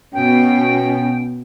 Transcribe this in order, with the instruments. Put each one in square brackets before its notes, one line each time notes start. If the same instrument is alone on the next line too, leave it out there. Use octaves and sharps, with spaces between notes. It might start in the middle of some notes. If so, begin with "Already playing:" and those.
[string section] B2 [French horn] C#4 [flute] G5